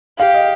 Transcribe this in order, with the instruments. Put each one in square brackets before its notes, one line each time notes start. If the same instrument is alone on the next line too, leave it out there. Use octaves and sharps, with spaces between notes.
[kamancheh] G4 [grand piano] F5
[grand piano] D#5